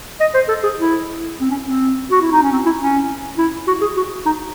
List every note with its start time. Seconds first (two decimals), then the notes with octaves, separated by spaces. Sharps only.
0.20 D#5
0.35 C5
0.49 A4
0.64 G#4
0.79 E4
1.41 C4
1.51 C#4
1.65 C4
2.11 F#4
2.22 E4
2.32 D#4
2.42 C#4
2.52 C4
2.66 E4
2.81 C#4
3.38 E4
3.68 F#4
3.82 G#4
3.97 F#4
4.26 D#4